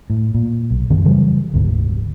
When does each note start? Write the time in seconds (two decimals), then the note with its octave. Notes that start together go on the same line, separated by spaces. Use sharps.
0.10 A2
0.35 A#2
0.71 B1
0.90 F#2 D3 D#3 C4
1.05 C#3 E3 F#3 G3
1.53 F1 D2 G#2 C3